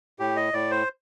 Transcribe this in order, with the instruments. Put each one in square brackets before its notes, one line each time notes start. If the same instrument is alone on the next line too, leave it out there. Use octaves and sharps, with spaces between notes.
[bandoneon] A2 G4
D#5
A2 D5
C5